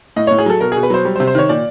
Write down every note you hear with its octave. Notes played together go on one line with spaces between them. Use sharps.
A2 D#5
A2 C#5
G#4
F#3 A4
B2 A#4
B2 G#4
B4
F#3 C5
G3
C5
C3
C5
D#3 C#5
A#2 D5